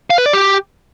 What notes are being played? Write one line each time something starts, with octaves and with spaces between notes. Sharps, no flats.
F5
B4
D5
G4